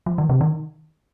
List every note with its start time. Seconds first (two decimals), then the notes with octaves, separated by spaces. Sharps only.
0.06 F3
0.18 D#3
0.29 C3
0.41 D#3